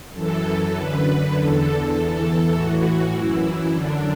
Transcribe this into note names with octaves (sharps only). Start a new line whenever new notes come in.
F#2 E3 A4
F#2 D3 B4
E2 D3 A4
E2 E3
A2 E3 F#4
F#2 E3 E4
F#2 D3 D4